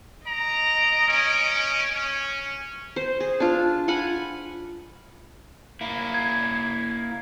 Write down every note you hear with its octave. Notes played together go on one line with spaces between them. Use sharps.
D#5 A#5 D7
C#4
C#4
C5
G#4
D4 F4
F4 F#5 G#5 B5
A#3 E4
G#6